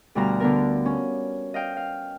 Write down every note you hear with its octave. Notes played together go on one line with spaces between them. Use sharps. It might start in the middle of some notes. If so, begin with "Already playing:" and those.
D2 B2 G3 F#4 F5 A#5
D3 B3 A#4
C#4
D#5 F5 G5
F5